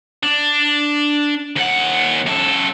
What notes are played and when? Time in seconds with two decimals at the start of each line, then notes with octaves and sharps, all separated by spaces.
0.23 D4
1.56 D#2 F#5
2.26 F#2 A4